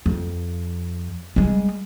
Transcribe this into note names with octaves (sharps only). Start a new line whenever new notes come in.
F2
G3 G#3